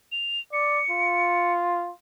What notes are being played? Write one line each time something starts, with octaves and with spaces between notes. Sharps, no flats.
F7
D5 C#7
F4